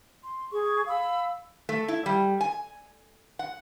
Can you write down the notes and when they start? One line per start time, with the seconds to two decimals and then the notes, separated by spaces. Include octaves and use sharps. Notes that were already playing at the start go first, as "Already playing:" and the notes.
0.23 C6
0.52 G#4 C#6
0.87 F5 B5 E6
1.69 A3
1.88 E4
2.06 G3
2.41 G#5
3.39 F#5